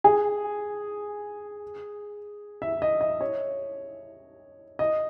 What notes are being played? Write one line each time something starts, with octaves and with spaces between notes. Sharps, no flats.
G#4
E5
D#5
D#5
C#5
D#5